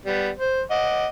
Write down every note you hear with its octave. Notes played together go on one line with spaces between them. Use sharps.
G3 B3
C5
D#5 F#5 D6